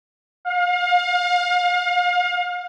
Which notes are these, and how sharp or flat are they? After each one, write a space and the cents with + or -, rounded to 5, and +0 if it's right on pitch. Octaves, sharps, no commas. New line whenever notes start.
F5 +35